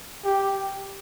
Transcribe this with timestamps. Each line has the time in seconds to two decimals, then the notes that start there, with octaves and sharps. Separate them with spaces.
0.24 G4